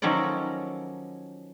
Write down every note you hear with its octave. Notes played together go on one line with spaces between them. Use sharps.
D#3 F3 F#3 C#4 A4 D5